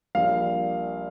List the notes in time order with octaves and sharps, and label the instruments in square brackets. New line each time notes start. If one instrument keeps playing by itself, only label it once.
[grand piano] A#1 A#2 G3 F5